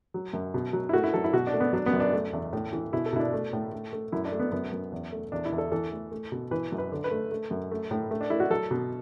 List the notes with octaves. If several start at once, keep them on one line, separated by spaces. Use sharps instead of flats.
F#3
F#2
B2
F#3
E4
A3 F#4
E4
F#3 A4
E4
B2 F#4
D4
A3
B3
F#3 D4
B3
F#2
D4
A3
E2
A2
E3
B2 E4
A4
B2 E4
D4
A3
A2
A3
A3
F#2 E4
D4
A3
B3
F#2 B3
F#2
E2
A3
E2 D4
E4
E2
A4
E3 A4
A3
A3
B2
E3 B4
F#2
B4
D3
B4
A3
A3
F#2
A3
A2
A3
D4
A3 E4
F#4
F#3 A4
B2